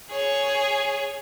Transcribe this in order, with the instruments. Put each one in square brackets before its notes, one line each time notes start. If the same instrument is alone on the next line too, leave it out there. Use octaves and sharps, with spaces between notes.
[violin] G#4 C#5